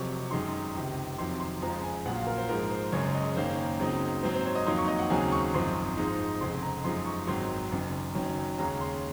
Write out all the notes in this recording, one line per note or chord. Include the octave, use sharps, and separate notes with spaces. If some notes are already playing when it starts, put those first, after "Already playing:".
Already playing: F1 F2 C3 F#3 C#6
F#2 D#3 G#3 D#4 C6
C#2 C3 D#3
F2 C3 D#3 F#3 C6
C6
F#1 F2 C#3 F3 G#3 A#5
G#5
A#1 A#2 F#3 F#5
F5
A#4
C5
G#2 F3 G#3 A#4
C5
F#1 F#2 C#3 G#3 C#5
D#5
F#1 F#2 D#3 A#3 C#4 C5
C#2 C#3 F#3 C4 D#4
G#2 F#3 C4 C5
C5
C#5
D#5
F2 D#3 F#3 A#3 D#4 C6
C#6
D#5
F#5
D#2 C#3 F#3 C4 D#4 G#5
C#6
G#1 F#2 F3 C4 D#4 C6
G#2 F3 G#3 D#4
F1 F2 C#3 C6
A#5
F#2 F3 G#3 D#4 C6
C#6
G#1 G#2 D#3 F#3 C6
F#1 F#2 D#3
F#1 F#2 D#3 F#3 C#4
D#2 C#3 G#3 C#4 A#5
C6